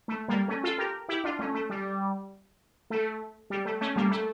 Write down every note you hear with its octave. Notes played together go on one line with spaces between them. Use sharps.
A3
G3 A#3
A3 C#4
F4 A4
G4 A#4
E4 G4
D4 F4
A3 C#4
A3
G3
A3
G3
A3
A3 C#4
G3 A#3
A3